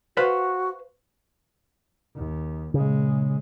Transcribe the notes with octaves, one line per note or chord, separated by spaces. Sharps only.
F#4 B4 C5 F5
D#2
A#2 C#3 G#3